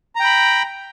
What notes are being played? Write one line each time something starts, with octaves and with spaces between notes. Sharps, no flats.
G5 A#5 B5